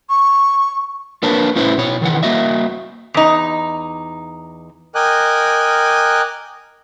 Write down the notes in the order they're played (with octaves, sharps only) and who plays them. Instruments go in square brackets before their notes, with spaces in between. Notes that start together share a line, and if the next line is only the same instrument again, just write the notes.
[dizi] C#6
[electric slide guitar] A#3 D4 A#4 B4 C#5 A5
A2 C#4 E4 B4 C5
B2 C#5
D#3 E3 F#5
A#3 F#4 D#5 E5
[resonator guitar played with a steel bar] E2 D#4
[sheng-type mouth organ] A#4 D#5 G5 G#5 D6 F#6